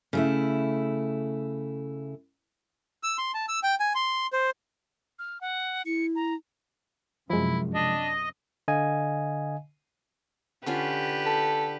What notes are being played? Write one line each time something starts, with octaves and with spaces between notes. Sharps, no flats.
C#3 A3 E4
E6
C6
A5
E6
G5
G#5
C6
C5
F6
F#5
E4 C#7
A#5
F#2 C3 F3 G#3 E4
C3 D4 D#5
D3 D#5 F5 G#5
D3 C#4 F4 G4 B4
A4